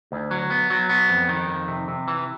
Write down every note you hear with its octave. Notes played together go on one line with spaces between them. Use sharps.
D2
F#3
B3
F#3
B3
F2
D#3
F2
C3
C3
E3